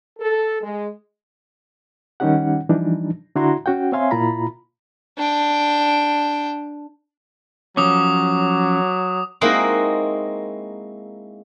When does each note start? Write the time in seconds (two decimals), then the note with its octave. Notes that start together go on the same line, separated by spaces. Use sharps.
0.19 A4
0.62 G#3
2.20 D#3 G3 C#4 D#4 G4 F#5
2.69 E3 F3 G3 D4 D#4
3.35 D3 D4 E4 F#4 A#5 C6
3.66 C#4 F#4 F#5 G5
3.92 C4 C#5 E5 F5 G#5 C6
4.11 A#2 E4 F4 A#5 B5
5.18 D4 G5
7.77 F3 F#3 C#4 D6 D#6
9.41 G#3 A#3 C4 D#4 E4 F#4